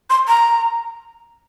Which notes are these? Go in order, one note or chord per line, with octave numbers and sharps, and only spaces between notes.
C6
A#5